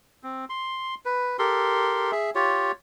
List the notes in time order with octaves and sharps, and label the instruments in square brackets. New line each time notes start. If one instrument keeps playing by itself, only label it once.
[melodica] C4
C6
B4
G4 A4 A#4 C6
G#4 E5
F4 G4 C#5